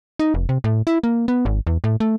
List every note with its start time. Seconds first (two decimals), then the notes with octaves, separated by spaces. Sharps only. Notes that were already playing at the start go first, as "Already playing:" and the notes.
0.19 D#4
0.34 F1
0.49 C3
0.64 A2
0.87 E4
1.04 A#3
1.28 B3
1.45 G#1
1.67 E2
1.84 A2
2.00 A3